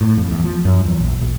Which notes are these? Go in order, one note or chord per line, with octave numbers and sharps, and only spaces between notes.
A2
F2
E2
F3
F#2
E2
A#1
A#1